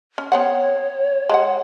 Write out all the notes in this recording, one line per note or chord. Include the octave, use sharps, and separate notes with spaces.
C#4
B3 C4 C#5 F#5
G#3 G4 F#5